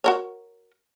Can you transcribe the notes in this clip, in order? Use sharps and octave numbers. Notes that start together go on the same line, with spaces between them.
F#4 A#4 C#5